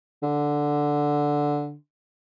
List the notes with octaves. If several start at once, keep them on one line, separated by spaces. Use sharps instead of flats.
D3